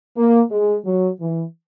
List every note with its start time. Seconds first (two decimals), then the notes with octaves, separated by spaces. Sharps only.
0.17 A#3
0.51 G#3
0.85 F#3
1.20 E3